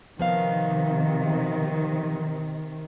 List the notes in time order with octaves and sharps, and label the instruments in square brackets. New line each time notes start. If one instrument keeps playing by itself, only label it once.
[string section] C3 D#3 [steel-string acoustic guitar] F3 B3 F5